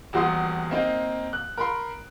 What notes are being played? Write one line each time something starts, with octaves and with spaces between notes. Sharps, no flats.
D#1 E2 F#4 F#5 C6 D#6
A#3 C4 D#4
F#6
A#4 B5 C6